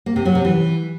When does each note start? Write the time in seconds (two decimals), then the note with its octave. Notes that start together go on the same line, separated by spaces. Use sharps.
0.06 A#3
0.16 C3
0.25 F#3
0.35 C3
0.45 E3